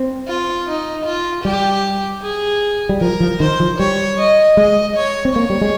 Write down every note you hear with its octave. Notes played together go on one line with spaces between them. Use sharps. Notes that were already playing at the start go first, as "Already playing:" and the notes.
Already playing: C4
F4
D#4
F4
G3 G4
G#4
G3
F3 A#4
F3
D#3 C5
F3
G3 C#5
D#5
G#3 D#5
C#5
C4
A#3 C#5
G3
G#3